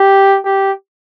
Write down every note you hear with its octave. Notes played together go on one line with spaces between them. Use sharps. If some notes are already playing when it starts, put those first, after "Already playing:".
Already playing: G4
G4